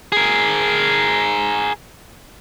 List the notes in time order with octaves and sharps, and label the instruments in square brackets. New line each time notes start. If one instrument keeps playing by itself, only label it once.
[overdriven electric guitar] G#4 A#4